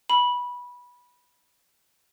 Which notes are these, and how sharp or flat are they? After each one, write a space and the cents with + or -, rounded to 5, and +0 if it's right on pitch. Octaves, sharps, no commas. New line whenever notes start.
B5 -15